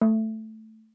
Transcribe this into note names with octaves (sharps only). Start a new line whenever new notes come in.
A3